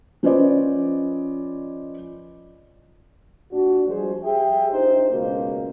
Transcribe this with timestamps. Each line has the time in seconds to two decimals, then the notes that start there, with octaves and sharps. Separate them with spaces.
0.23 F3 C#4 B4 C5 D5 D#5
3.52 A#2 D4 F#4
3.87 F3 G3 G#3 G#4 C5
4.24 G4 G#4 E5 G5
4.71 A#1 D#4 C5
5.11 C#2 B2 A#3